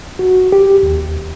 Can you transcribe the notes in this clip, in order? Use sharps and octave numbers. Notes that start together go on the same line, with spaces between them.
F#4
G4
D#2